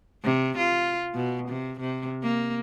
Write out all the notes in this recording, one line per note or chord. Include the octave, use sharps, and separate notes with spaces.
C3
F4
B2
C3
C3
A#3